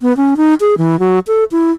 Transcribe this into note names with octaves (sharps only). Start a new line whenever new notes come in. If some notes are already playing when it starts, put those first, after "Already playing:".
B3
C#4
D#4
G#4
E3
F#3
A4
E4